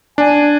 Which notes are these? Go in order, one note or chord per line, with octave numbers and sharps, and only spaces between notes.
D4 G#5